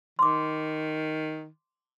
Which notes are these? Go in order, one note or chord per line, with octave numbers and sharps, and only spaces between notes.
D#3 C6 D6